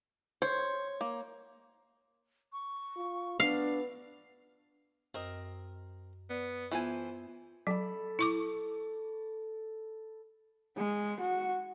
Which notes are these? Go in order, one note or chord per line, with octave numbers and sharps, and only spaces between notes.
C5 C#5
A#3
C#6
F4
B3 D4 F5
F#2 C4 A#4 D#5
B3 D5
E3 B3 F4 A4 C5 G#5
F#3 A4 B5
E4 C#6 D6
G#3
F#4